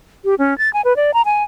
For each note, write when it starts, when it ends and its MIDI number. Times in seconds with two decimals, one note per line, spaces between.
0.25 0.35 67
0.39 0.57 61
0.58 0.72 93
0.73 0.81 80
0.85 0.96 71
0.96 1.14 74
1.14 1.22 82
1.25 1.43 80